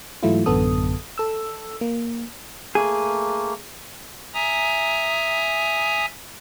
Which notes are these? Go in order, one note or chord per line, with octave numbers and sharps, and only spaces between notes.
G#2 E3 F#3 A3 E4 F4
A1 F#2 D3 B3 A4 D#6
A4 E6
A#3
A3 A#3 G#4
E5 G#5 A#5 D#6